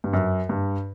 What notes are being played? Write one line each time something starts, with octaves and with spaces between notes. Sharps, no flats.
G2
F#2
G2